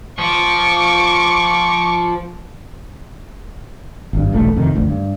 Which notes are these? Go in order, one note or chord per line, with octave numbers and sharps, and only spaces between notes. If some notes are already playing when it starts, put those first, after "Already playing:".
F3 C#6 D6
G#1 G2
E1 A#1 A3
F2 C3 D#3
G1 D2
G2